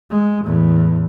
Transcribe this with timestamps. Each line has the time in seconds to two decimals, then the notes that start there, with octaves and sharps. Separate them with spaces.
0.11 G#3
0.45 E2 A2